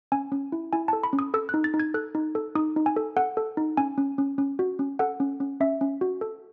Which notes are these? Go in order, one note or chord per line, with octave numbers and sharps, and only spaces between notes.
C#4 G#5
C#4
E4
E4 G#5
A4 A5
B5
C#4
D#6
A4 E6
D#4 F#6
A6
D#4
G#6
A4 F#6
D#4
A4
D#4 D#6
D#4
G#5
A4
A4 F#5
A4
D#4
C#4 G#5
C#4
C#4
C#4
F#4
C#4
A4 F#5
C#4
C#4
C#4 E5
C#4
F#4
A4